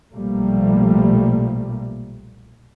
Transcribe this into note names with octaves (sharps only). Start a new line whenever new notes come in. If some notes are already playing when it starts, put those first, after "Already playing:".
B1 A#2 F3 G3 A3 A#3